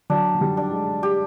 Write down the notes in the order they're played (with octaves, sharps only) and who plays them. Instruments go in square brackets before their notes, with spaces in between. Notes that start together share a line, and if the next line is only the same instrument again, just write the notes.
[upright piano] F#3 [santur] D4
[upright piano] F#3
G3
[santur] D4
[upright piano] G#3
[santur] G4